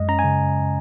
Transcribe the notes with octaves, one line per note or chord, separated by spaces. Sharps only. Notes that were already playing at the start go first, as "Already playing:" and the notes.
Already playing: F#2 G#3 D#5
C#4 A#5
G#5
C#3